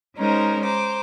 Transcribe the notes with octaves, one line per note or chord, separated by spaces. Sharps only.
G#3 C#4 D#4 A#4 C5
C5 A#5 D6